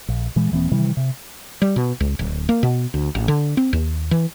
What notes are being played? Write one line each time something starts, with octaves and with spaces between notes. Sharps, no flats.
A#1
A#2 E3 G#3
D#1 E3 A#3 C4
C3 D#3 E3 G3
C3
G3
B2
C#2
D1
A#3
B2
D2
A1
D3
C4
D#2
E3